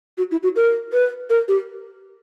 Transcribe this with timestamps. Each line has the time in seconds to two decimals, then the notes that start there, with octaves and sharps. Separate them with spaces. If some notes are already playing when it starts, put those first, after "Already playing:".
0.18 F#4
0.31 E4
0.43 F#4
0.56 A#4
0.93 B4
1.30 A#4
1.48 G4